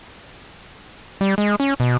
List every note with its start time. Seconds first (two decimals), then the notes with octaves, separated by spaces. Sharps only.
1.21 G3
1.38 G#3
1.60 C#4
1.80 B2